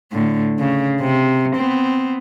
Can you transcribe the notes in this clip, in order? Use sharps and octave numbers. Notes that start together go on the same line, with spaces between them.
A2 D3
C#3
C3
B3 C4